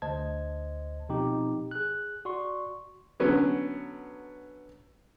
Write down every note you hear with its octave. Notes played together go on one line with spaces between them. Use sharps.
D2 C5 D#5 A5 G#6
B2 F3 C4 D#4 G4
G#4 F#6
F#4 D5 C6 C#6
D3 F#3 B3 C#4